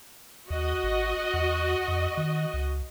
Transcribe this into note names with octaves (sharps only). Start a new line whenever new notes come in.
D#2 F#4 D#5
G#1
E2
F2
D#3
C#2